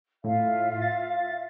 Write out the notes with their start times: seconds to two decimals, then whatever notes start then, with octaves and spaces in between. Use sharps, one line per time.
0.24 A2 F4 E5 F5
0.82 A6